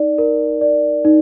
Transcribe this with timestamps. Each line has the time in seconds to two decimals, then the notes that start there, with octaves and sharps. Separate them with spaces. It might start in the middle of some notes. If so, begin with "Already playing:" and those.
Already playing: D#4 D5
0.18 A#4
0.61 D5
1.05 D#4